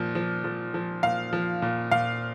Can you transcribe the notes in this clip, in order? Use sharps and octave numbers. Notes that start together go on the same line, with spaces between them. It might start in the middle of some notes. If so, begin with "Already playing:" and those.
Already playing: A#2 F3
F3
F3
F3
A#2 F5
F3
A#2
A#2 F5